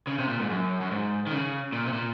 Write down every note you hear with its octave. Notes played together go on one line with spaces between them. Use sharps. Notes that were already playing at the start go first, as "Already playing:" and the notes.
C#3
C3
A#2
G#2
F#2
F#2
G#2
D#3
C#3
A#2
C3
A#2